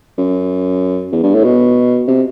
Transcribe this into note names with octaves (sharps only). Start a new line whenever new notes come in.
F#2
E2
G2
A2
B2
C3